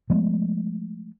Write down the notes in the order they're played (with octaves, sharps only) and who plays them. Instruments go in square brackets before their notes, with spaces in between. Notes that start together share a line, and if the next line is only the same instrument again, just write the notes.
[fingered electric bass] F3 G#3 A3 B3